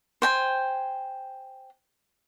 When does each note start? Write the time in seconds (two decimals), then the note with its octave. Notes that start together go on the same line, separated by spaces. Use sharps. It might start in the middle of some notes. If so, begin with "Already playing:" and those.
0.22 C5 G5 G#5